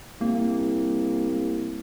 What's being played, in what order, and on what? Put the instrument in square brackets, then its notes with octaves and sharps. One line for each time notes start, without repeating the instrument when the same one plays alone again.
[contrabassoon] C2 [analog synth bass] A#3